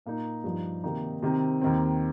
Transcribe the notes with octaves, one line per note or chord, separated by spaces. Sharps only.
A#2 A#3 D#4
G2 F3 D#4
C3 D#3 A#3 D#4
C3 D#3 C4
D#2 D#3 C4